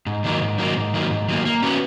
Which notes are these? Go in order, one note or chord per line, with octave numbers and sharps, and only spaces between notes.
G#2
D#3 F#3 A#3
G#2
D#3 F#3 A#3
G#2
D#3 F#3 A#3
G#2
D#3 F#3 A#3
A#3
C#4 F#4 B4